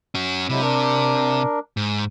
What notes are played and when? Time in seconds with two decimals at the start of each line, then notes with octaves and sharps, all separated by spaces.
0.15 C#4 F#4
0.49 C3 F#3 G#3 E4
0.62 D4 A#4
1.77 G#2